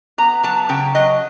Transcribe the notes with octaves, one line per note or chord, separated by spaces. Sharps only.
B3 A#5
F#3 A5
C#3 G5
F#3 D#5